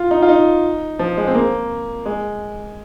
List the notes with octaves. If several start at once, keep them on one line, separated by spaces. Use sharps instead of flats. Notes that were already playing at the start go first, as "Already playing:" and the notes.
Already playing: F4
D#4
F4
D#4
F3
G#3
C4
A#3
G#3